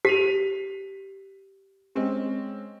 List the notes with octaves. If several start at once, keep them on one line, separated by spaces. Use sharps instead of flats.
G4 B6 D#7 F7
G#3 C4 C#4